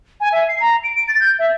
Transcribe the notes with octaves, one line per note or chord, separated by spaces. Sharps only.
G#5
E5
C7
A#5
D7
D7
A6
G6
E5